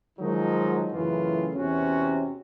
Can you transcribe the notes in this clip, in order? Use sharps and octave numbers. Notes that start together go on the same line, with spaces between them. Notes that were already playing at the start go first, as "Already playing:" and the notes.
D#3 F3 F#3 G#3 D#4
F#2 A2 C#3 E3 F4
E2 C3 C#4 F#4